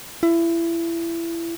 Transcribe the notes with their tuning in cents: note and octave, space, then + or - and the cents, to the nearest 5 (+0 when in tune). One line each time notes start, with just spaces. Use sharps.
E4 +25